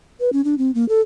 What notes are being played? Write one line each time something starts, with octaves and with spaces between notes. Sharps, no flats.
B4
C#4
D4
C4
A#3
A4